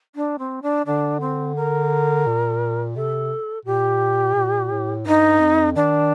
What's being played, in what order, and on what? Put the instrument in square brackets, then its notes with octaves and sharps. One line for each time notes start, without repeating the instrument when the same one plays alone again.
[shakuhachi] D4
C4
D4
[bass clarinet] D3 [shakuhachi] D4
[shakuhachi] C4
A#4
[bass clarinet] A#2
[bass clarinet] C3 [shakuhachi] A4
[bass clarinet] A#2 [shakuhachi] G4
[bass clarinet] A#2
A2
[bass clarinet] G2 [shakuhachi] D#4
[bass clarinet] F2
[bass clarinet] D#3 [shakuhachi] D4